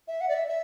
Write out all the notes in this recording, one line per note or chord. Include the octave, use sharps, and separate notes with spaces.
E5
F#5
D5
E5
E5